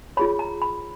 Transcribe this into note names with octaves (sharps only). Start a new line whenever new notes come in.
F4 G#4 C#5 B5
A#5
B5